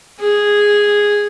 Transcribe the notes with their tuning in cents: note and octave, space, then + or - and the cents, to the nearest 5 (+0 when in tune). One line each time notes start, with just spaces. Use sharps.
G#4 -5